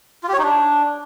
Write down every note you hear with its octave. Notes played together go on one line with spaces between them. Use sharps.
F4
G4
C#5
D#4
D4